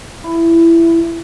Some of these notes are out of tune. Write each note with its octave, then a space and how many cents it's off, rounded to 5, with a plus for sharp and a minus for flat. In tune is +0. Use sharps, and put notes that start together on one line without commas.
E4 +15